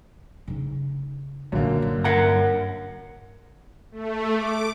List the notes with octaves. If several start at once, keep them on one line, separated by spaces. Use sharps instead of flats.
C#3 D#4
A#1 F#2 D3 A#3
G2
A#4 F#5 A#5
A3
D6